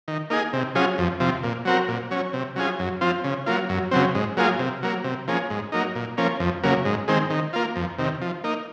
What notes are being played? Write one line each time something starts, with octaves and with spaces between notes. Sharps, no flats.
D#3
A#3 D#4 G#4
C3
F#3 C#4 F4 G#4
F2
C3 F3
A#2
F#3 C4 F#4 A#4
A#2
F#3 C#4
C3
F#3 C#4 F4 G#4
F#2
F3 C4 F4
C#3
F#3 A#3 F4
F#2
C#3 F#3 C4
G#2
F#3 A#3 F4 G#4
C3
F#3 A#3
C3
F3 A#3 C#4 G#4
G#2
F#3 A#3 D#4
A#2
F3 A#3 C#4
F2
C#3 F#3 A#3
G#2
D#3 G#3 C4
D#3
A#3 F4
F2
C3 D#3
F3
A#3 D#4